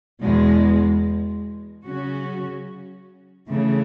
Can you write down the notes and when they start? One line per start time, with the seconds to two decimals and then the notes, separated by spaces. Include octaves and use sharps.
0.23 E2 B2 G#3
1.85 C#3 F#3 C#4 F#4
3.49 C#3 E3 A3